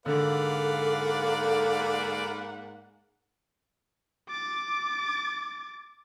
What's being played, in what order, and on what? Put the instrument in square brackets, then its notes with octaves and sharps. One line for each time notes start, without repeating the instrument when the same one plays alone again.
[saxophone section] G#2 A#3 F#5 [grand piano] D3 [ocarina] A4 [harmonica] B4 D5 F5
[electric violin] D6 A6